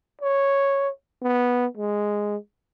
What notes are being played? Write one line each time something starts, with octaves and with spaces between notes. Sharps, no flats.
C#5
B3
G#3